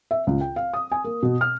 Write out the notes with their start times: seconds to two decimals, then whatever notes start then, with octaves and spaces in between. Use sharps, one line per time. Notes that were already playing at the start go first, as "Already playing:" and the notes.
0.11 E5
0.27 C#2
0.41 G5
0.56 F5
0.73 D#6
0.92 G#5
1.04 A#3
1.23 B2
1.41 F6